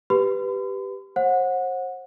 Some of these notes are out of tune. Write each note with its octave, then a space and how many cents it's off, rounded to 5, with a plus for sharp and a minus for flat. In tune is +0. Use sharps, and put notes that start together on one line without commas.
G4 +0 B4 +0 B5 +45
C5 +35 F#5 -20